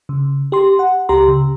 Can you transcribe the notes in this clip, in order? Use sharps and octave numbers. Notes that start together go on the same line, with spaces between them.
C#3
G4 C6
F#5
C#2 G4 A#5 C6
C#3